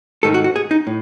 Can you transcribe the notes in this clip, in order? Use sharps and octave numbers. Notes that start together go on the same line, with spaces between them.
G#2 D#3 A3 D#4 A4
F#4
F#4
G#4
D#4
A2